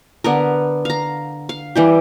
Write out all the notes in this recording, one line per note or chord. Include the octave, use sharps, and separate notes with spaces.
D3 B3 A#4
F5 A#5
F5
E3 G3 G4